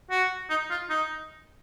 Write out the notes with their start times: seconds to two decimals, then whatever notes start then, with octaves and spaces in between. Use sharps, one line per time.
0.11 F#4
0.50 D#4
0.70 F4
0.90 D#4